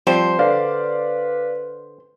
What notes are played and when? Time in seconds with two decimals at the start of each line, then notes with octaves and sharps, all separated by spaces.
0.07 F3 G3 C4 C5
0.39 D3 B4 D5 F5